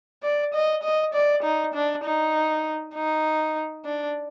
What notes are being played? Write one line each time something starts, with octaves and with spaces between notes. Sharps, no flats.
D5
D#5
D#5
D5
D#4
D4
D#4
D#4
D4